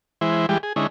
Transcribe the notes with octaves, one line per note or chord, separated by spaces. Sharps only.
E3 G#3 E4 C5
E3 G3 G#3 G4
G#4
D3 G#3 C#4 D#4 E4